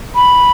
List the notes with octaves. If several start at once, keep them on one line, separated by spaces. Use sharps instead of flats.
B5